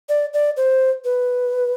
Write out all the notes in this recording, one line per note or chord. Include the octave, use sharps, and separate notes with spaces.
D5
D5
C5
B4